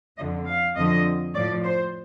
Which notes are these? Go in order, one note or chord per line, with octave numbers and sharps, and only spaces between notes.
F2 D3 F3 D#5
F5
F2 D3 F3 D#5
A2 F3 D5
C5